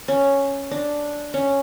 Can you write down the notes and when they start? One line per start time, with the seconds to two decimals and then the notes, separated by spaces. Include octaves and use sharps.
0.08 C#4
0.71 D4
1.34 C#4